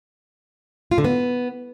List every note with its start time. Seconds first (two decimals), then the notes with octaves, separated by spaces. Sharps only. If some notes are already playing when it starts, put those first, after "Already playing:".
0.91 F4
0.98 D3
1.04 B3